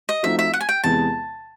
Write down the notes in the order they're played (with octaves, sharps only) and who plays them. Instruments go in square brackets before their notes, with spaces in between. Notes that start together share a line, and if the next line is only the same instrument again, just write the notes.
[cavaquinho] D#5
[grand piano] F3 A3 C4 D#4 F#4 [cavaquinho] E5
[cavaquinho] E5
F#5
G#5
G5
[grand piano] E2 C3 E3 G#3 B3 [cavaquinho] A5